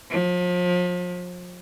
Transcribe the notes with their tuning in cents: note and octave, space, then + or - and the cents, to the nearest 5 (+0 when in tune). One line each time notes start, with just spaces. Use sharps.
F3 +35